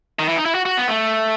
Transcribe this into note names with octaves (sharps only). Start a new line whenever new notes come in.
D#3
E3
D#4
E4
F#4
F#4
B3
A3